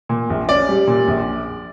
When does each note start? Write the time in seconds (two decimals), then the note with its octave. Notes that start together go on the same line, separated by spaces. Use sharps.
0.09 A#2
0.30 A#1
0.49 C#4 D5
0.68 G3
0.87 A#2
1.08 A#1